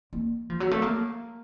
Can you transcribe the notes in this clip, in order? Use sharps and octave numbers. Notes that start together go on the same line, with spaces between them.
A#3
F3
F#3
A3
A#3